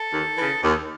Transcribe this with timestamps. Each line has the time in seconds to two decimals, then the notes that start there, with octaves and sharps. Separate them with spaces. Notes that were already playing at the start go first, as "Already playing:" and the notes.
Already playing: A4
0.11 D#2
0.37 C#3 E3
0.63 D#2